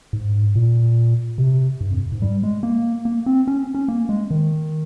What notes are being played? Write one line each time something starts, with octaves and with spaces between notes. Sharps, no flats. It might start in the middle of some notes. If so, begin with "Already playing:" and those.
G#2
A#2
C3
G2
F2
G#2
G3
G#3
A#3
A#3
C4
C#4
C#4
A#3
G#3
D#3